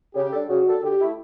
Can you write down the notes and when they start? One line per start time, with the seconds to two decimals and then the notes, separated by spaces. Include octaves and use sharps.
0.15 C#3 G4
0.32 G3 D4 A4
0.49 C#3 F#4
0.66 G3 D4 A4
0.83 D3 G4
1.01 A3 E4